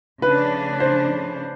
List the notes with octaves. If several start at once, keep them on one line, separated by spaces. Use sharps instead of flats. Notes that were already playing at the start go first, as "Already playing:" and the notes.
C#3 F3 A3 D4 B4
C5